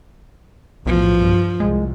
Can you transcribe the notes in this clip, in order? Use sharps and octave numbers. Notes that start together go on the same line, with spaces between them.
B1 E2 A2 F3
G2
C2 G#3